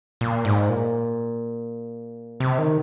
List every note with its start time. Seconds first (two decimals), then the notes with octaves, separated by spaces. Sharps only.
0.21 A#2
0.45 G#2
0.69 A#2
2.40 C3
2.58 D#3